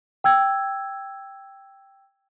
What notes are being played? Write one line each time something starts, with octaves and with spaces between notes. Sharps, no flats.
G5 E6 G#6